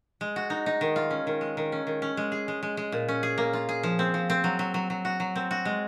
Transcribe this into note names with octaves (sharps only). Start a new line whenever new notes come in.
G#3
F#4
D#4
D#4
D#3
F4
C#4
D#3
G#3
D#3
C#4
D#3
C#4
G#3
G#4
G#3
G#3
G#3
A#2
C#4
G#4
A#3
F4
G#4
F3
C4
F3
C4
F#3
F#3
F#3
F#3
F#4
F#3
C4
F#4
G#3